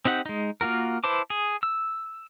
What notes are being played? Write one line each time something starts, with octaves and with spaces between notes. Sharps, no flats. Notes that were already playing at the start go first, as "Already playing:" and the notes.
C4 D#4 G4 F#5
G#3 D#4
A#3 F4 F#4 A#4
E4 B4 C5 A5 D6
G#4
E6